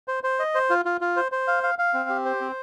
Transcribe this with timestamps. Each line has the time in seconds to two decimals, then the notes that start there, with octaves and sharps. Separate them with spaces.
0.08 C5
0.24 C5
0.39 D#5
0.55 C5
0.70 F4
0.85 F4
1.01 F4
1.16 C5
1.32 C5
1.48 F5
1.63 F5
1.79 F5
1.94 C4
2.09 G4
2.25 C5
2.41 C4